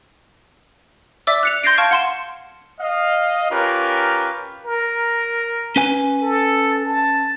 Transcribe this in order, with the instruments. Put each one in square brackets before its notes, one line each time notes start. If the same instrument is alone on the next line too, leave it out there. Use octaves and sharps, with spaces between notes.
[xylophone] D5 E5 D6 E6
F#6 C#7 F7
C6 G6 A6 A#6 C7 D7
F5 A5 C#6 F6 G#6 D7
F#5 C6 E7
[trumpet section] D#5 F5
C#4 F4 G4 A#4 B4
[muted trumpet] A#4
[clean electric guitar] C#4 B4 G#5
[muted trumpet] A4
A5